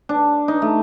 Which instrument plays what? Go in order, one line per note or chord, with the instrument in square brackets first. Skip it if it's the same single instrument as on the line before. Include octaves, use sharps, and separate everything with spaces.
[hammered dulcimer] D4
D#4
A3